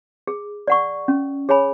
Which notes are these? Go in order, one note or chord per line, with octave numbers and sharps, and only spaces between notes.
G#4
D5 F#5 C#6
C#4
G#4 C#5 G#5 B5